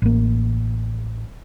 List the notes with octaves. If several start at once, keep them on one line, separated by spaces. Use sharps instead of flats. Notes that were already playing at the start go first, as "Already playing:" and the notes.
A1 A#3